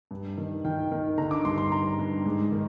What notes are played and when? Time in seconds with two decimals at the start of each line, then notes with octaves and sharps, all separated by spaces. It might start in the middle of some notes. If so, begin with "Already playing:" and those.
0.11 G2
0.38 D#3
0.64 D#3 G5
0.91 D#3
1.18 D3 A#5
1.31 D6
1.45 G2 C6
1.58 C6
1.72 G2 A#5
1.99 G2
2.25 G#2
2.52 D#3